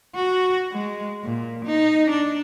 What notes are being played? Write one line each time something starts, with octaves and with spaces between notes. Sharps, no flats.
F#4
G#3
A#2
D#4
D4